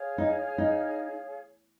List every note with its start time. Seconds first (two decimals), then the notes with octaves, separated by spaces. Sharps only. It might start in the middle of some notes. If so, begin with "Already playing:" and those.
Already playing: G#4 C#5 F5
0.18 D#4
0.58 D#4